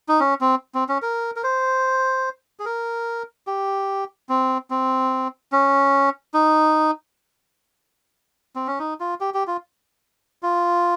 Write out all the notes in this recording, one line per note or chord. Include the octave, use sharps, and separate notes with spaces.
D#4
C#4
C4
C4
C#4
A#4
A#4
C5
G#4
A#4
G4
C4
C4
C#4
D#4
C4
C#4
D#4
F4
G4
G4
F4
F4